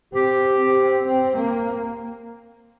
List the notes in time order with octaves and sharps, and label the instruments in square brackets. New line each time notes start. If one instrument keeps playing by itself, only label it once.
[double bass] C4 [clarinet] G4
[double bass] C4
C4
A#3